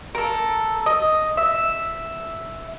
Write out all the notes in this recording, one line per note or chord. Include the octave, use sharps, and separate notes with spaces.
A4 A#4
D#5
E5